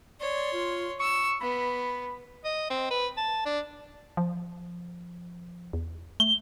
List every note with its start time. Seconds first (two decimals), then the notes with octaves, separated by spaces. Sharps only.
0.20 C#5 D5 C6
0.53 F4
1.00 C#6 E6
1.41 B3 B5
2.45 D#5
2.70 C4
2.91 B4
3.17 A5
3.45 D4
4.17 F3
5.73 E2
6.20 A3 G7